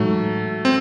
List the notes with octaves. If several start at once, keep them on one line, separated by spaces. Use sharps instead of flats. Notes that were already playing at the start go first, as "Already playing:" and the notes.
Already playing: A2 E3 F#3 G#3 A3 D#4 F#4
C4